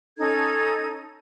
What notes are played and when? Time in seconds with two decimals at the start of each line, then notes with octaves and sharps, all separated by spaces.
0.18 C#4 D#4 A4 G#6